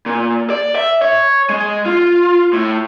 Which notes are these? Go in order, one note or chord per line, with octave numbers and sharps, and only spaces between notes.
A#2
D5
E5
C#5
G#3
F4
A2